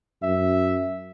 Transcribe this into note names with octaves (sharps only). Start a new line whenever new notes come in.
F#2 E5